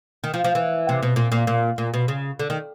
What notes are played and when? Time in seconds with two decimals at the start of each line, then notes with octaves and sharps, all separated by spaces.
0.24 D#3
0.34 F3
0.44 F3
0.55 E3
0.89 C3
1.03 B2
1.16 A#2
1.32 A#2
1.47 A#2
1.78 A#2
1.94 B2
2.08 C#3
2.39 D3
2.50 D#3